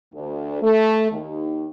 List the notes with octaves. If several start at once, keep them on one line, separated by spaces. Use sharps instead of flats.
D2
A3
D#2